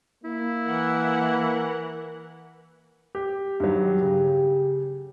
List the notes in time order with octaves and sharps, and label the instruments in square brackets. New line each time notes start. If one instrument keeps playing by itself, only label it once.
[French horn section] A#3 [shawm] E4
[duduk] E3 [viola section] A#4 F#5
[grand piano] G4
[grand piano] G2 D#3 F#3 [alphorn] G4
[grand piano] C#3